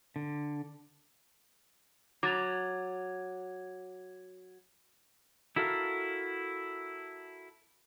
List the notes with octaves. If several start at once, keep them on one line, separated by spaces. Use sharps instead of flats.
D3
F#3 D6 A6 F7
E4 F#4 A4 A#4 F5